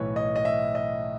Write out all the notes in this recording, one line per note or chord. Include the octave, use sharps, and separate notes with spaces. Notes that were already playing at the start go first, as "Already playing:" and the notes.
Already playing: B1 A2 E3 B4 C#5
D#5
D#5
E5
D#5